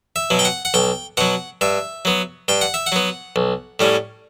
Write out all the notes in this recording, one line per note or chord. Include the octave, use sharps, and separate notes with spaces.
E5
B2 F#3
G5
F#5
F#5
B1 G5
B2 F#3 F#5
G2 E5
F#3 B3
G2 G5
F#5
E5
F#5
F#3 B3
B1
A2 G3 C#4